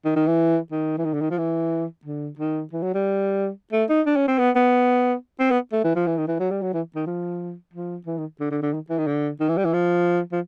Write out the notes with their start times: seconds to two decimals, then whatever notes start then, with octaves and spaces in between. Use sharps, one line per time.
0.05 D#3
0.16 D#3
0.27 E3
0.71 D#3
0.98 E3
1.05 D#3
1.13 D3
1.21 D#3
1.31 F3
1.38 E3
2.05 D3
2.39 D#3
2.72 E3
2.83 F#3
2.94 G3
3.72 A3
3.89 D#4
4.06 D4
4.16 C#4
4.28 C4
4.38 B3
4.55 B3
5.39 C4
5.50 B3
5.72 A3
5.84 E3
5.95 F3
6.07 E3
6.17 D#3
6.28 E3
6.40 F#3
6.51 G3
6.62 F#3
6.73 E3
6.95 D#3
7.06 F3
7.73 F3
8.06 E3
8.17 D#3
8.40 D3
8.51 D3
8.62 D3
8.74 D#3
8.90 E3
8.98 D#3
9.07 D3
9.40 D#3
9.49 E3
9.57 G3
9.65 E3
9.73 F3
10.32 F3